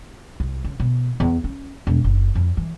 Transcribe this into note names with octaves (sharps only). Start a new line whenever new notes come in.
C2
C#3
B2
E2
C#4
E1
F#1
F2
E3